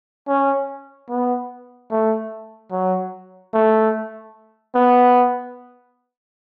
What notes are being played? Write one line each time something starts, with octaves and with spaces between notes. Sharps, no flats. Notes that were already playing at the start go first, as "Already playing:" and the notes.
C#4
B3
A3
F#3
A3
B3